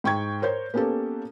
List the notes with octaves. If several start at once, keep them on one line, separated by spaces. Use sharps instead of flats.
G#2 G5 C#6 G#6
A#4 C5 C#5 G6
A#3 B3 C#4 G4 A4